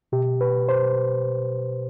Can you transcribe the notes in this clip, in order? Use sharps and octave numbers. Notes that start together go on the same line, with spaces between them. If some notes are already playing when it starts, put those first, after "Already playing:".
B2 G4
B4
C5